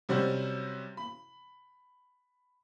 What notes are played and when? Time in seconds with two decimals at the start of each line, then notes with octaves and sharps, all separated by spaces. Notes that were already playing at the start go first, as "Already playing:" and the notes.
0.09 C3 F#3 G3 C#4 F#4 C5
0.97 B5